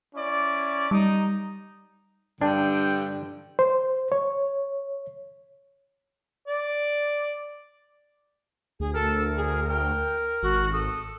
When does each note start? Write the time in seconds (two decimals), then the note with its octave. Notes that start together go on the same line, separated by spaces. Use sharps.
0.14 C#4 E4 D5
0.91 G3 D#4
2.41 G2 D3 D4 G5
3.59 C5
4.12 C#5
6.48 D5
8.80 D2 G#4
8.94 A4 A#4
9.37 G#4
9.69 A#4 G5
10.43 G#1 F#4
10.73 A4 D#6